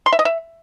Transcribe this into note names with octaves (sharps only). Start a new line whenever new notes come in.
C6
E5
D#5
E5